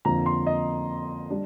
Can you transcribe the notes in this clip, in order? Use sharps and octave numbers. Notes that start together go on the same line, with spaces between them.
F2 D3 F3 A#3 A#5
C6
D#5
G3 D4